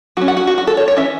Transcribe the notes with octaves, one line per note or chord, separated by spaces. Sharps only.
F#3 C#4 F#4
F#5
F#4
F#4
F#4
A4
C#5
C#5
E3 C#4 E5